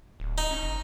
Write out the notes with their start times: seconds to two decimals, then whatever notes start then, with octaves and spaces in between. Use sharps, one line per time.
0.20 D1
0.38 D#4
0.51 C#4
0.63 F#1